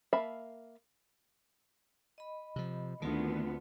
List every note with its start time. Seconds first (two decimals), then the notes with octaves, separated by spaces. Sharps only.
0.13 A#3 E5 F5 A5 B5
2.18 D#5 B5
2.56 C3 F3
3.02 D2 D#3 A3 B3 C4 F4